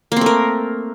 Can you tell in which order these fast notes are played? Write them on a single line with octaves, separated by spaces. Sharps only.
A#3 C4 A3 A#4